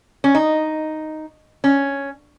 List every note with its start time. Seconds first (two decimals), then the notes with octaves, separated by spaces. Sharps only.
0.24 C#4
0.35 D#4
1.64 C#4